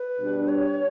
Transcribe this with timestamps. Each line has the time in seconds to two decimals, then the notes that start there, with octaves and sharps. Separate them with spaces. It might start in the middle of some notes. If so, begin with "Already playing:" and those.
Already playing: B4
0.19 B2 G3 D4 G4
0.48 C#5